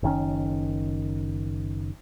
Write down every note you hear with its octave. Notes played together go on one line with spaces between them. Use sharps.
F#1 D#3 C#4